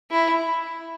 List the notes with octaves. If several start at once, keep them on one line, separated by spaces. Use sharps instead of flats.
E4